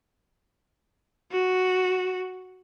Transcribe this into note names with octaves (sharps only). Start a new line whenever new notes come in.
F#4